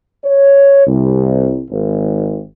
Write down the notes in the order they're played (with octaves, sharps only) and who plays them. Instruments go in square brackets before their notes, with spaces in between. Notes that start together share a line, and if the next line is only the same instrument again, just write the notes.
[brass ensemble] C#5
C2
G#1